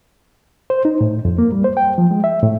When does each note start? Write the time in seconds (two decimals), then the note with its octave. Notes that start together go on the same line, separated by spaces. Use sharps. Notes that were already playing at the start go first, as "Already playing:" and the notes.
0.70 C5
0.85 D#4
1.01 A2
1.25 F2
1.38 A#3
1.52 G3
1.64 C5
1.77 G5
1.98 F3
2.11 G#3
2.24 E5
2.43 A2